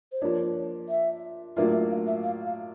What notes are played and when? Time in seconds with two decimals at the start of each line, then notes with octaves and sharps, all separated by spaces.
0.12 C5
0.22 F3 A#3 D4 C#5
0.89 E5
1.56 A2 F#3 A#3 D4 F4 E5
1.72 E5
1.90 F5
2.07 E5
2.24 F5
2.46 F5